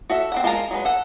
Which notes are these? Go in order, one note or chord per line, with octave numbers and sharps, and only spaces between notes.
F#4 A4 E5
C4 E4 F#5
G#3 F4 A#4 A5 A#5
F#3 G#3 B4
A4 F#5